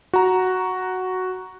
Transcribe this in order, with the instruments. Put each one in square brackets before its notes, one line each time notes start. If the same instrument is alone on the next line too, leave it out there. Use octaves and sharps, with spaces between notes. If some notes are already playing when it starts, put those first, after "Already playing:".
[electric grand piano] F#4 A#5